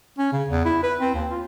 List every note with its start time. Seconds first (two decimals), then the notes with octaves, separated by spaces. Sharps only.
0.18 C#4
0.32 C#3
0.48 E2
0.65 E4
0.83 B4
1.00 C4
1.14 D#2
1.31 F4